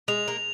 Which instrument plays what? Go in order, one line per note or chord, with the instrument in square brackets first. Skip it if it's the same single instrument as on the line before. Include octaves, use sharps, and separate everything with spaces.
[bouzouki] G#3 [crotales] F7
[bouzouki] A#3